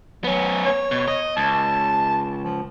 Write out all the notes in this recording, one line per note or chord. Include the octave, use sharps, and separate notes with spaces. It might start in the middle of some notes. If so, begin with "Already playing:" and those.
F#3 B3 C#4
C#5
B2
D#5
C#2 A5
F3